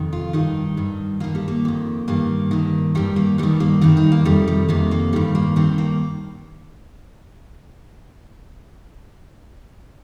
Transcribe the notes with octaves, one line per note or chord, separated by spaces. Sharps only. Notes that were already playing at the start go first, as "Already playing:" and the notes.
Already playing: F2 C3 D#3
F4
G2 D#3 D#4
G2 D#3
G2 D#3 A#3
G3
A#3
F2 D#3
G2 D#3 A#3
G2 D#3
G2 D#3 G3
A#3
G2 D#3 G3
A#3
G2 D#3 C4
D#4
A#3
F2 C3 D#3 G3
G3
F2 C3 D#3 A#3
A#3
G2 D#3 G3
A#3
G2 D#3 C4
A#3